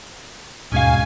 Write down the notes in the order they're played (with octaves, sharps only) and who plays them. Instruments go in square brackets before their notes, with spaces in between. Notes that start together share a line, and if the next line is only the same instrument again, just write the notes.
[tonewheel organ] D#2 [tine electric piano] G#2 B2 G#3 [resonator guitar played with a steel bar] C#4 F5 [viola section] G#5